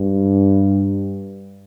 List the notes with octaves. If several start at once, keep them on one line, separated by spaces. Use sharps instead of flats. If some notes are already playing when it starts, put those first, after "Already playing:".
Already playing: G2